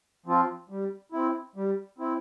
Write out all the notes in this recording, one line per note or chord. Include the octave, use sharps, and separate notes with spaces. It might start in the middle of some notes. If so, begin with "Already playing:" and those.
F3 C4 F4
G3
C4 E4
G3
C4 E4